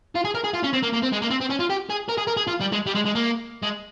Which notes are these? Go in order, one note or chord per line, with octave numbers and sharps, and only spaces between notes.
F4
G#4
A#4
G#4
F4
C#4
C4
A#3
A#3
C4
G#3
A#3
C4
C4
C#4
F4
G4
G#4
A#4
G#4
A#4
G#4
F4
G3
G#3
G3
G#3
G#3
A#3
G#3